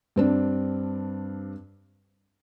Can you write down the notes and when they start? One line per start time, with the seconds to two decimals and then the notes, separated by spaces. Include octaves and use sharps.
0.16 G2 C4 D4